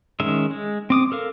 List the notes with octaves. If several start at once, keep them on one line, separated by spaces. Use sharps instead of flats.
D#3 G#3 C#4 E5
G#3
C4 D6 D#6
A4 A#4 F5